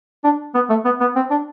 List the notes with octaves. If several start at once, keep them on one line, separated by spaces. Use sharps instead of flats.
D4
B3
A3
B3
B3
C4
D4